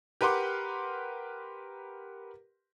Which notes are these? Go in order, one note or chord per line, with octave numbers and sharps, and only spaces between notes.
G4 A#4 B4 F#5 C6 D6